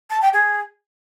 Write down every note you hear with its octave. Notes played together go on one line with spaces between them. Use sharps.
A5
G5
G#4